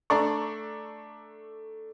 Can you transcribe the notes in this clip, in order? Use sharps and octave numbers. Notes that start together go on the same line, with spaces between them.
A3 D4 A4 D5 A#5 C#6